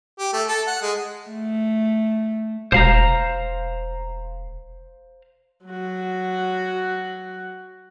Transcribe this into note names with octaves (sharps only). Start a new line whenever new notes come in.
G4
A3
A4
F#5
G#3
A3
E1 C5 F5 A#5
F#3 F#4